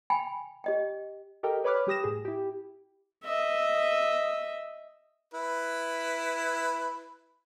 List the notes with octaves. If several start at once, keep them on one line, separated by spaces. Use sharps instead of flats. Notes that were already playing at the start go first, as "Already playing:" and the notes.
G5 G#5 B5
G4 D#5 G5
G4 A4 A#4 D#5 G5
B4 C#5 B5 D6 F6 F#6
G3 G4 D#6 A#6 E7
A2 G#4
E4 G4
D#5 E5
E4 B4